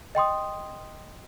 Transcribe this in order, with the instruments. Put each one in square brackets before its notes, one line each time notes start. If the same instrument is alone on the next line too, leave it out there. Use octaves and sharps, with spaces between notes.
[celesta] D#5 G5 C6 D#6